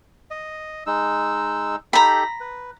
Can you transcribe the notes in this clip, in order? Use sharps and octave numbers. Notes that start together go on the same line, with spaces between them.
D#5
G#3 D#4 E6
D#4 G4 A4 A#5 B5
B4